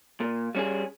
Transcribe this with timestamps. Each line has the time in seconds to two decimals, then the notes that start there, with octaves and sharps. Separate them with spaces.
0.20 A#2
0.55 G3 C#4 G#4